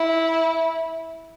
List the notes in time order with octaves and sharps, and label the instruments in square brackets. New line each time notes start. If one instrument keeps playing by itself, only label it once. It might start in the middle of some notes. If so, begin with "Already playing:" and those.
Already playing: [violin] E4